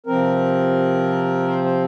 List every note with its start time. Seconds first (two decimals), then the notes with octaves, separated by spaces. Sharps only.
0.07 C3 F3 C4 A#4
1.47 C5
1.64 C5